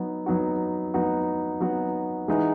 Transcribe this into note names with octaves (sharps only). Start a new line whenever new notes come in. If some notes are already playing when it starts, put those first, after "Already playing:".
Already playing: F#3 B3 D#4 F#4
F#3 B3 D#4 F#4
F#3 B3 D#4 F#4
F#3 B3 D#4 F#4
E3 G#3 D#4 F#4 B4